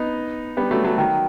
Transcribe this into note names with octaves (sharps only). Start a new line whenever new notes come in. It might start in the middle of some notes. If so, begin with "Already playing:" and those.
Already playing: B3 D#4
G3 B3
F#3 A3
F#3 A3
D#3 F#3